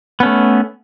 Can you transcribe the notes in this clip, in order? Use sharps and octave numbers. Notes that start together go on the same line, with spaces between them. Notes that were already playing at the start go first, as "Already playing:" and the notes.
A3 B3 C#4